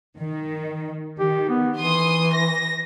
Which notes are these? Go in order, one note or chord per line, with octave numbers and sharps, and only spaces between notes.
D#3
D#3 G4
B3
E3 C6 D#6
A#6